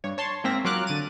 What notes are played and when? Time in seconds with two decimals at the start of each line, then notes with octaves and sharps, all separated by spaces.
0.04 G2 C#5
0.18 C#5 A5 C6
0.44 G#2 A#3 C4 E5 A#6
0.65 F#3 F4 A#4 D6 F6 F#6
0.87 D3 A6 D#7